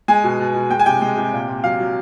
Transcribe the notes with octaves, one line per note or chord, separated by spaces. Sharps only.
G#3 G#5
B2
B2
B2
G#3 G5
G#5
C3 G5
G#3
C3
A#2
A#2
F#3 F5
F#3